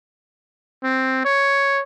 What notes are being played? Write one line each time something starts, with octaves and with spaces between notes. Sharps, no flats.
C4
C#5